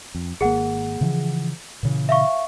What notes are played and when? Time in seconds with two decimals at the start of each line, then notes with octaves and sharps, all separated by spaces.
0.15 F2
0.41 G#1 A#3 G#4 F#5
1.01 C#3 E3 F3
1.83 A#2 C#3 E3
2.09 E5 F5 C#6